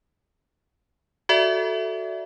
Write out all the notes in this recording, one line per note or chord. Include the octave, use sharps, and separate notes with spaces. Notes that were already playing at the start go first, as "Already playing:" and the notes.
F#4 A4 D5 E5